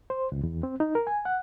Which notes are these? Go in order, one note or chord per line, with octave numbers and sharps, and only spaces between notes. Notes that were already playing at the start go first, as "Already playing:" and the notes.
C5
C#2
E2
C4
D#4
A#4
G#5
F#5